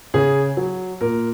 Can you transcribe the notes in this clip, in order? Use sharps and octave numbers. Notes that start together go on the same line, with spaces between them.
C#3 G#4
F#3
A#2 A#4